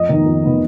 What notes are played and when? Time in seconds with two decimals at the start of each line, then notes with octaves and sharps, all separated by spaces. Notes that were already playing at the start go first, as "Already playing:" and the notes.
Already playing: F2 D#5
0.09 D#3 B3 D#4
0.26 F2
0.44 D#3 B3 D#4